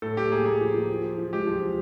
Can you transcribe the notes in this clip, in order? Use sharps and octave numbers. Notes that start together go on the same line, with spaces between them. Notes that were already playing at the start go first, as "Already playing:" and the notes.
A2 A4
A2 G4
A#3 G#4
A#3 G#4
F3
F3
F3
F3
F3
G#3 G4
F3
F3